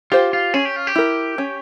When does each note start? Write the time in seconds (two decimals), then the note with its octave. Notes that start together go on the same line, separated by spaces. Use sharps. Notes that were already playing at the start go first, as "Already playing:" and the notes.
0.12 F4 G4 C5
0.33 F4
0.54 C#4 G#4
0.65 G4
0.76 F4
0.87 G4
0.95 E4 A#4
1.38 C#4